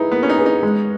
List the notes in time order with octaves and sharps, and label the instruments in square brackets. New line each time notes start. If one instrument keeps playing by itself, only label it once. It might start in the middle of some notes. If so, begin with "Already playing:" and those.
Already playing: [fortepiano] D#4 [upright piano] E4 G#4 B4
[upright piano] A#3 [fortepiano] B3
[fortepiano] C#4
D#4
[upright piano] E4 G#4 B4
[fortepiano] D#4
[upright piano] G#3